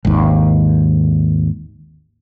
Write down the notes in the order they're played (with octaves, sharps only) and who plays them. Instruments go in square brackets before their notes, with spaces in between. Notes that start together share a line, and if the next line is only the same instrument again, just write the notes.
[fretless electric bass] G#1 D#2